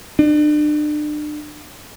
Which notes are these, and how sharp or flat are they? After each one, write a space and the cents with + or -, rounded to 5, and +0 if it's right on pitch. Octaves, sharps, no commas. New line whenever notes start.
D4 +35